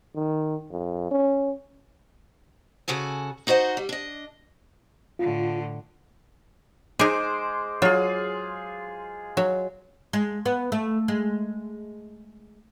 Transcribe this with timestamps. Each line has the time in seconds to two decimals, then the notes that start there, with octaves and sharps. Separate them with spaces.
0.15 D#3
0.71 F2
1.11 C#4
2.88 C#3 F#4 A4 G#5
3.47 D#4 F#4 C5 D#5 F#5
3.77 G3
3.89 D4 D#5
5.19 A2 D3 F4
6.99 G#3 D#4 G#4 C5 D6
7.82 F#3 F4 G#4
9.37 F#3
10.13 G#3
10.46 B3
10.72 A3
11.08 G#3